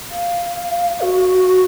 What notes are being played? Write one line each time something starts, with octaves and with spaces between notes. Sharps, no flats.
F5
F#4